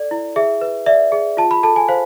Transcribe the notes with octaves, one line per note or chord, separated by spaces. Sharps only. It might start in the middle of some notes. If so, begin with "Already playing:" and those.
Already playing: A4 D5
E4
G#4 E5
B4
D5 E5
G#4
F4 A5
B5
A4 A5
G#5
C5 F5